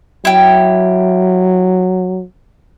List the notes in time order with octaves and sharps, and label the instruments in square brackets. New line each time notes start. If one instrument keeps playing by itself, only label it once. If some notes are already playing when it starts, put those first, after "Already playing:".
[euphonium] F#3 [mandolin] E4 G4